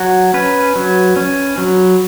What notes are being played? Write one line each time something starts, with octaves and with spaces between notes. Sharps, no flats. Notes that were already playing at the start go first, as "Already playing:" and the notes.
Already playing: F#3 F#4
C#4 B4
F#3
C#4
F#3